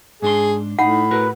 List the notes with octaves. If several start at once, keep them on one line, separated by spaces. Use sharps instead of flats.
G#2 D4 G#4 C6
A2 D#4 F#5 B5
F#4 A#4 B4